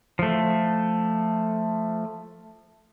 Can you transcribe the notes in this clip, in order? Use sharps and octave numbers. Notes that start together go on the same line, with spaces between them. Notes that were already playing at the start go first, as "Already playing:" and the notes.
F3 A3